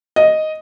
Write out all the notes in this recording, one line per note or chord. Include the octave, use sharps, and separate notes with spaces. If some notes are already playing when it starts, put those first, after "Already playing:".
D#5